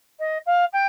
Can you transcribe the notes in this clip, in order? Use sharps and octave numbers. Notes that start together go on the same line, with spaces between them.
D#5
F5
G5